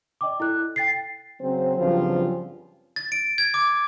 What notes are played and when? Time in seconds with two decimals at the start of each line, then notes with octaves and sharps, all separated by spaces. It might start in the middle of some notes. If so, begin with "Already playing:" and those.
0.21 D5 D#5 G5 D6
0.40 E4 A4 F#6
0.76 G5 A6 C7
1.41 C#3 F#3 C4 C5
1.77 G2 C#3 F3 F#3 C4 F4
2.96 A6
3.12 D7
3.38 G#6
3.54 D6